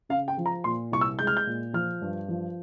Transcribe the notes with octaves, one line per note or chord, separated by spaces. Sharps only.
C#3 F5
G5
F3
A#5
A#2 C6
C2 C#6
E6
G#3 G6
F6
G6
A#2
F3 F6
G2
F3